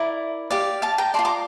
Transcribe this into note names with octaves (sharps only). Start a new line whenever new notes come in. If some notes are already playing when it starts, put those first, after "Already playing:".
Already playing: E4 A#4 D5
G4 D5 F5
F5 A5
G5 A#5
F4 A#4 D5 A5 C6
A#5 D6